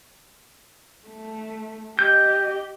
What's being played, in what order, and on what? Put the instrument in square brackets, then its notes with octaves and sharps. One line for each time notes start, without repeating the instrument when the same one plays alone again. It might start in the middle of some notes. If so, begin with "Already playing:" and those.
[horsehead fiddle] A3
[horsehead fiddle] G4 D#5 [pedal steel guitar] G6